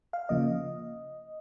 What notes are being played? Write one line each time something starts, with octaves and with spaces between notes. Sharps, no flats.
F5
C#3 F3 A#3 D#5